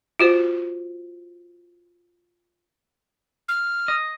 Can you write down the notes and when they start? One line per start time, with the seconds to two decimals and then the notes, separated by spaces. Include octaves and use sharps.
0.19 F4 F#4 C5
3.48 F6
3.88 D#5